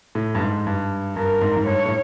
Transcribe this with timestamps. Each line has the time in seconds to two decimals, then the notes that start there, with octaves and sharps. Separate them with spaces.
0.15 A2
0.35 G2
0.41 G#2
0.67 G2
1.16 G2 A#4
1.41 G#2
1.57 G#2
1.66 G2 C#5
1.86 A2